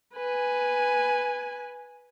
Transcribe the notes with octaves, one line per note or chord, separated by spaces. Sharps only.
B4 G#5